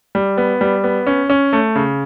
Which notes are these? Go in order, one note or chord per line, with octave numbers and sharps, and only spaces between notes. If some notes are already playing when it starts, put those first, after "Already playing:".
G3
B3
G3
B3
C#4
C#4
A3
C#3